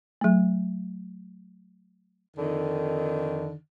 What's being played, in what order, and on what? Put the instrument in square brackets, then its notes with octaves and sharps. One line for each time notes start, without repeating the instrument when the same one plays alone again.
[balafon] F#3 A3
[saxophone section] F2 D3 D#3